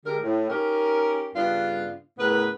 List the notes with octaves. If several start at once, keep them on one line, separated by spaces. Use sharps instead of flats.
D3 G#3 G4 A#4
A2
C#4 D#4 G4 A#4
G2 C#3 B3 D4 F4
A2 C#3 B3 A#4 B4